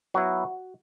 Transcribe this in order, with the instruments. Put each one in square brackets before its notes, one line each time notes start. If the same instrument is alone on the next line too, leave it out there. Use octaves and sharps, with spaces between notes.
[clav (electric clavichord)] F#3 B3 E4 F#4